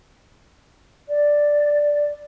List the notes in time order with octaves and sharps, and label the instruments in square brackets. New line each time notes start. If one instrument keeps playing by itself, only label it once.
[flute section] D5